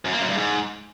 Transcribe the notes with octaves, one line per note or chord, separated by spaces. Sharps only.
F#2
A#3
F#2
G2
G#2